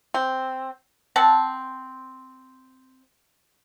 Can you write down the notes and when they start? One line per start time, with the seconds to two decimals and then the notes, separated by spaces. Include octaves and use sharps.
0.14 C4
1.16 C4 F#5 A5